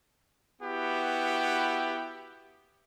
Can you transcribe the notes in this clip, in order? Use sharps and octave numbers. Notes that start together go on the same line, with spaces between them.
B3 E4 F#4 G4